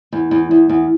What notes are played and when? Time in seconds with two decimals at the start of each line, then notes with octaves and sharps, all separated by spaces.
0.13 E2
0.31 E2
0.51 E2
0.69 E2